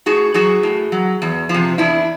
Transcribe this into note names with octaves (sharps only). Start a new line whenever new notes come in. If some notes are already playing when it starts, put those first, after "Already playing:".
A2 F#4 G#4
F#3 F#4 G#4
A2
F#3
E2
F3
C3
E2 D4 E4